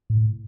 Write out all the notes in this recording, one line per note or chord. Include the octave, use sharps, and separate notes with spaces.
A2